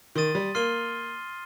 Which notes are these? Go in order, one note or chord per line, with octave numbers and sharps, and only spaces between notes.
D#3 C6 D#6 A6 D#7
G3
A#3 C6 F6 C7 D#7 G7